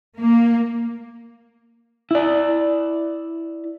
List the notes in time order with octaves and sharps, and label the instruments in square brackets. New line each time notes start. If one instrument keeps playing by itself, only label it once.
[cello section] A#3
[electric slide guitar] E4 D5